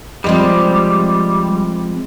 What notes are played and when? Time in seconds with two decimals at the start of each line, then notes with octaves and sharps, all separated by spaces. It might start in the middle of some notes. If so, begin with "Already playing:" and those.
0.24 C3 F3 G3 G#3